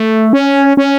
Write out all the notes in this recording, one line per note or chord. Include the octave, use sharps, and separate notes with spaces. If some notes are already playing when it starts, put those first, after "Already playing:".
Already playing: A3
C#4
C#4